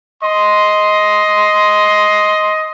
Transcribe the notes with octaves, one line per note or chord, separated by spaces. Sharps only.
D#5 C6